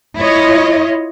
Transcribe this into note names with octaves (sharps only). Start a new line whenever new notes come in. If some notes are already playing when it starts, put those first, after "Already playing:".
E4 F4 C#5 D#5